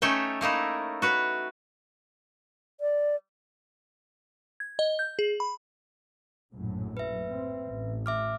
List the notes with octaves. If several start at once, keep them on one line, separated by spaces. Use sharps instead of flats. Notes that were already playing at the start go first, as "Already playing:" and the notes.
A3 C#4 D#4 C#5 E5 G5
A3 A#3 D#4 E4
F#4 B4 C#5
D5
G#6
D#5
G6
G#4
B5
A#1 F#2 A2
B4 E5
C4
A1
E5 D6 F6